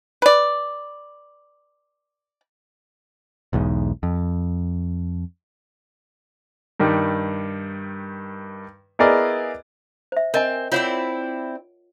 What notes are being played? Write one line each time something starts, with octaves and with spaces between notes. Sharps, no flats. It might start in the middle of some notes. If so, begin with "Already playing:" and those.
B4 D5
B1 E2 G#2
F2
G2 D#3 G3
B3 E4 G#4 A#4 D5 D#5
C5 E5
C4 A#4 D#5 G#5
C4 E4 F4 C#5 D5 F#5